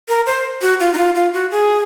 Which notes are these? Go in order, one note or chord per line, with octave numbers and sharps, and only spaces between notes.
A#4
C5
F#4
F4
D#4
F4
F4
F#4
G#4